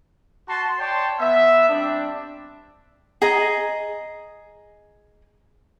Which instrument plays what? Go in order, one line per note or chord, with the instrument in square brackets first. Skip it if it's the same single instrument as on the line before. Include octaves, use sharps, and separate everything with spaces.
[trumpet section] F#4 A5 C6
C#5 D5 G5 A5 C6
B3 E5
G3 C4 D4
[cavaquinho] G#4 D#5 A#5